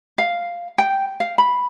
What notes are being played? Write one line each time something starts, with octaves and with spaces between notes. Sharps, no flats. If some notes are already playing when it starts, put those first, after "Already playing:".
F5
G5
F5
B5